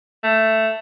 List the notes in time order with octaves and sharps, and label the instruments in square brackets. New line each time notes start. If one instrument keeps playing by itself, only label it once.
[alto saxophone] A3